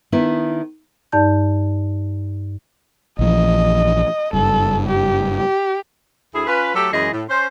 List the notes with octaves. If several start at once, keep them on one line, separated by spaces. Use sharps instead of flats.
D#3 B3 D4 E4
G2 D#4 D5 A5 G6
A#1 E3 F3 D#5
F#1 G2 A4
G4
G4
D2 E4 G#4
C#4 F4 B4
F#3 A3 G4 A4
F#2 E3 G#3 G#4 D#5
A2
C#4 C5